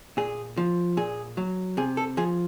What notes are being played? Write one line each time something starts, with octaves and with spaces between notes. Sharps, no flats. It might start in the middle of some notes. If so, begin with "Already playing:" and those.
A#2 G#4
F3
A#2 G#4
F#3
C3 G#4
A4
F3 G#4